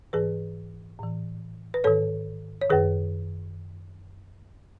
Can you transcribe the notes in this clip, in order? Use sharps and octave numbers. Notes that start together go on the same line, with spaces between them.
G#2 E3 G#4 B4
A2 E3
B4
G#2 D#3 A4 C#5
C#5
F#2 D#3 G#4 B4